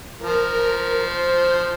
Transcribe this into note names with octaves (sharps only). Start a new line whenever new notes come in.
F3 A#4
C5